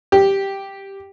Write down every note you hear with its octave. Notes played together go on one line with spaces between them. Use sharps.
G4